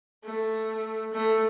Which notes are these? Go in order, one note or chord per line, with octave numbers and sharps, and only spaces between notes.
A3
A3